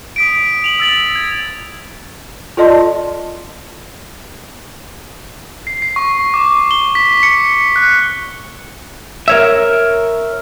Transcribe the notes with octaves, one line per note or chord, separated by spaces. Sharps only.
D#6 B6 D7
D7 F7 F#7
E6 A6 F#7
G#6
F4 A4 D5 D#5 A5 C6
C7
C7
C#6
D6
G7
B6
C#7
F#6
A#4 C#5 E5